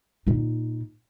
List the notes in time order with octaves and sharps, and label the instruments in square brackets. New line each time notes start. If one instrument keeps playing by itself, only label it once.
[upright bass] A#2 D#4